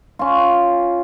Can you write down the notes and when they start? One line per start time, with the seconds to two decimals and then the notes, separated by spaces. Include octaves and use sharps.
0.19 C#4 F4